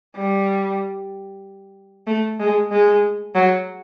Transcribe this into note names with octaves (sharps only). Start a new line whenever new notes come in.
G3
A3
G#3
G#3
F#3